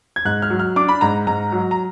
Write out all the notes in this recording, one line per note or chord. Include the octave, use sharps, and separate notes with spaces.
G#6
G#2 F#6
F6
F#3
F6
D4 D6
B5
G#2 A#5
G#2 A#5
F#3
A#5